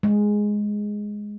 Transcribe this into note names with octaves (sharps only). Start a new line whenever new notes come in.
G#3